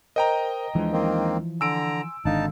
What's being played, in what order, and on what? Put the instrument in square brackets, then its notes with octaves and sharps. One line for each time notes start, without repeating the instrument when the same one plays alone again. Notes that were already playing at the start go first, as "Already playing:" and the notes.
[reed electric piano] A#4 C5 [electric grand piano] D#5 G5 A#5
[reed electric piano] D#2 G#3 D4 [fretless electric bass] E3 F3
[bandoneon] D#3 A#3 C4
[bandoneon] D3 A#5 [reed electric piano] G#5 C6 [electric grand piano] E6 D7
[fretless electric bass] G#1 D3 [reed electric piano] D4 F5 [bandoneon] D#4 A5